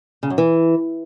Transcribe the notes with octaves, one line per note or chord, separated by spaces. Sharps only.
C#3
F#2
E3